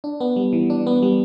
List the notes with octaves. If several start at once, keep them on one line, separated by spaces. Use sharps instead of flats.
D4
B3
G3
E3
D4
B3
G3